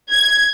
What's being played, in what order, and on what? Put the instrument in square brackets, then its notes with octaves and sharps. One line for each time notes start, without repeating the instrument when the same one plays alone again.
[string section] G#6